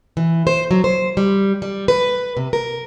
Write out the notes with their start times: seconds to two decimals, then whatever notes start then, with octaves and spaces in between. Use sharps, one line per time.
0.17 E3
0.47 C5
0.71 F#3
0.84 C5
1.17 G3
1.62 G3
1.88 B4
2.37 C3
2.53 A#4